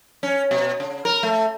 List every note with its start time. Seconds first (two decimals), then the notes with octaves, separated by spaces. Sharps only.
0.23 C#4
0.51 B2
0.80 C#3
1.05 A#4
1.23 A3